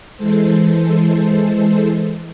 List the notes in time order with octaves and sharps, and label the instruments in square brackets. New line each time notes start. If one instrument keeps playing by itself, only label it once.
[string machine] E3 G#3 A4 C5